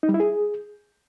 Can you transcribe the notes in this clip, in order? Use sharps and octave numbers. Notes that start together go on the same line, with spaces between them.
D#4
G3
E4
G#4